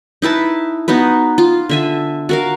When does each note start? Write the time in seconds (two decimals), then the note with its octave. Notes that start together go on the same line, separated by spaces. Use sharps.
0.22 D#4 E4 B4 A5
0.88 B3 D#4 F#4 B4
1.38 F4
1.69 D3 E5 G#5
2.29 F#4 A#4 F5